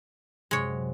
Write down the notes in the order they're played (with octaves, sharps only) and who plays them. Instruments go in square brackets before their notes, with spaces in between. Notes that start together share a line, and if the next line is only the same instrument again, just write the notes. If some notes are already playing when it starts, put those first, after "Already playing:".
[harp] F#2 C3 [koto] G#3 C#5